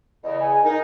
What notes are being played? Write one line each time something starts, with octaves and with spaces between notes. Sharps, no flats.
E2 C#3 D#5
G#5
D#4 A#4